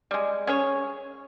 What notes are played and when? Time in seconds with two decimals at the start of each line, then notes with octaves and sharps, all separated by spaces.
0.11 G3 G#3
0.47 C#4 G#4 C#5